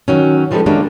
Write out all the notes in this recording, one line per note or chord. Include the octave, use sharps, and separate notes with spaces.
D#3 F#3 C#4
E3 F3 G3 G#3 A4 B4
D#3 G3 G#3 A#3 C#4 D4